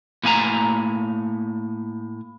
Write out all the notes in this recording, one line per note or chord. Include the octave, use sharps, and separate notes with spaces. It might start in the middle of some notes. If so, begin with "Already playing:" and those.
A2 A#3 G#5 A#5